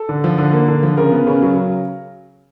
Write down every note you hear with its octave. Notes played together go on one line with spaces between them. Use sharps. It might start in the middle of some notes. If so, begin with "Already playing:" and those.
Already playing: A4
D3
F3
D3
A#3
D3
F3
C#3 A#4
B3
C#3
F#3
C#3